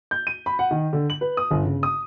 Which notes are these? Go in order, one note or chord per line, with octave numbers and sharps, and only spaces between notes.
G6
D#7
B5
F#5
D#3
D3
F#7
B4
D#6
G1
C#3
D#6